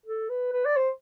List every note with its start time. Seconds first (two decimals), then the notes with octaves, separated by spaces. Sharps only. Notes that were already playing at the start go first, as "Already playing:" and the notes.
0.06 A4
0.30 B4
0.53 B4
0.65 D5
0.77 C5